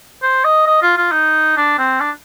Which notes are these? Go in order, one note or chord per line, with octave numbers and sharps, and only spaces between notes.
C5
D#5
D#5
F4
F4
D#4
D4
C4
D4